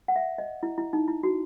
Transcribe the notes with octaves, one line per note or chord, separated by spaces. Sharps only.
F#5
E5
D#5
E4
E4
D#4
E4
F#4